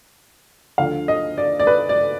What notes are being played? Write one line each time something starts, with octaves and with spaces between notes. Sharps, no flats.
D2 D3 F3 F5
D#5
D5
D5
B4
D5